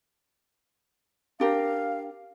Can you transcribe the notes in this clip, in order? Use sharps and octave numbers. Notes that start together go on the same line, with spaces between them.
D4 G4 A#4 F5